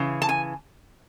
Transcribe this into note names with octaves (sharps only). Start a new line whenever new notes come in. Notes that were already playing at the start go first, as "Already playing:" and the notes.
Already playing: C#3 E3
A5
G#5